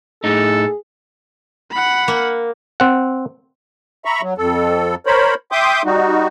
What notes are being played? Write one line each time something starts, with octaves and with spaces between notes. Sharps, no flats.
A2 A3 D#4 G#4 A4
F#5 B5
A#3
C4 F#5
E5 A#5 B5 C#6
F#3
F2 A4
A#4 C5 C#5 B5
E5 G5 C6 D6 D#6 G6
G3 D#4 F#4